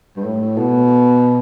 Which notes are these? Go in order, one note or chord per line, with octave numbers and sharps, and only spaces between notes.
G2
A2
B2